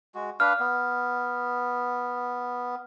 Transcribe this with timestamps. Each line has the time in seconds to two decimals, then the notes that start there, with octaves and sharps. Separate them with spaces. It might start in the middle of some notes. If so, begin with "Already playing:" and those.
0.15 G#3 F#4
0.40 D4 B4 F5 F6
0.60 B3